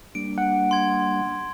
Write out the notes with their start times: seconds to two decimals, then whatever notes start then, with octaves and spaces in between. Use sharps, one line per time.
0.15 G3 A#3 D4 D7
0.38 F#5
0.71 C6 G#6